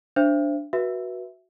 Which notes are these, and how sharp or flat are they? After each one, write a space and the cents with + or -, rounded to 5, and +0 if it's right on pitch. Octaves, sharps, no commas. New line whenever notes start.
D4 +0 C5 +0 E5 +30
F#4 +0 B4 -25 E5 +0